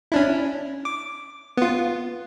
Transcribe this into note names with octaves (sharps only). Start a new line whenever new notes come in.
C#4 D4 E4
D6
B3 F4